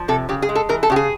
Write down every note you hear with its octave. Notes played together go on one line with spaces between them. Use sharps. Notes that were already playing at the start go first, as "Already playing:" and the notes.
Already playing: F3
C3 A4
C#3 G4
G#4
G#3
A4
E3 A#4
A4
C#3 G4
G#4